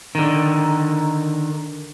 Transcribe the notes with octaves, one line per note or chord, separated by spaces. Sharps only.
D3 D#3